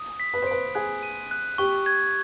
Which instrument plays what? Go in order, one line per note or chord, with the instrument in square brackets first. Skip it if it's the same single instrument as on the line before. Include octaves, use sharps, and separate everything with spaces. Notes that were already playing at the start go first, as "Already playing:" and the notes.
Already playing: [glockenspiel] D#6
B6
[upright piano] B4
C5
[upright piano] B4 [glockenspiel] D7
[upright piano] G#4 [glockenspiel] F#6
[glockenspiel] D#7
F#6
[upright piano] G4 [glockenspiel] C#6
[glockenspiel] G#6